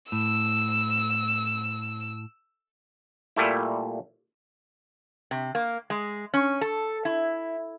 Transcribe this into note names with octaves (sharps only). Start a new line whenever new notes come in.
A2 E6
A#2 G3 A3 E4
C3
A#3
G#3
C#4
A4
E4